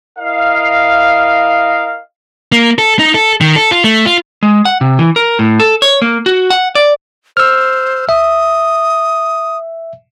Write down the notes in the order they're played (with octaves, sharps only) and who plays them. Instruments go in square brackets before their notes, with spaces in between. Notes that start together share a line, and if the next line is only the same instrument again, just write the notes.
[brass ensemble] E4 A#4 D#5 F5
[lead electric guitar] A#3
A4
D#4
A4
D#3
A4
F4
A3
F4
[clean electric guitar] G#3
F#5
C3
E3
A#4
A2
A4
C#5
A#3
F#4
F#5
D5
[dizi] C5 [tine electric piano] E6 F6
[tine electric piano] E5 [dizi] D#6